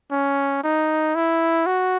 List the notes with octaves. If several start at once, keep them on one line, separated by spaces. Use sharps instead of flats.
C#4
D#4
E4
F#4